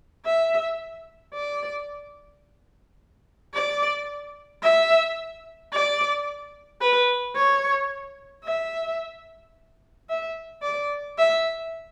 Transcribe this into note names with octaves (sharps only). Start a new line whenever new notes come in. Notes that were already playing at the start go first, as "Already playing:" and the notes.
E5
D5
D5
E5
D5
B4
C#5
E5
E5
D5
E5